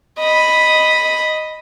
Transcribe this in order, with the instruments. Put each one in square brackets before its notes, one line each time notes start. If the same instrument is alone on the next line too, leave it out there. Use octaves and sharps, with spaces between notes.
[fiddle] D#5 B5